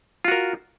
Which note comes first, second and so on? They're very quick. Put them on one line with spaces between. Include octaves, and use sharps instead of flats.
F4 F#4 A#4